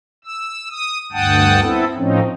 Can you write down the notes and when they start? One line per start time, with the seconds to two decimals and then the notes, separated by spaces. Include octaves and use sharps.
0.25 E6
0.70 D#6
1.12 D2 G2 F#5 G5 A5 D#6
1.60 B3 C4 E4 A4
1.96 A2 F3 C4 C#4 D#4